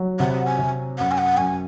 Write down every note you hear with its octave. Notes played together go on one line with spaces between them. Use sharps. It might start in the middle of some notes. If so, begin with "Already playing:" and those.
Already playing: F#3
C3 F#5
G#5
C3
F#2 F#5
G#5
F#5
F#2 G#5